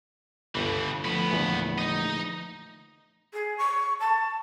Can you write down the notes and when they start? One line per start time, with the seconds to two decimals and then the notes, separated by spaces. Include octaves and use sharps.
0.55 G1 C#2 G2 B2 E3 G5
1.05 A2 D3 F3 A3 B3
1.31 A#1 E2
1.78 D#4 D#5
3.33 G#4
3.58 C#6
4.00 A5